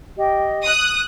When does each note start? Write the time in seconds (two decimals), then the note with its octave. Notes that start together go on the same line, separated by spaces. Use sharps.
0.17 G4 D#5
0.64 D#6 F#6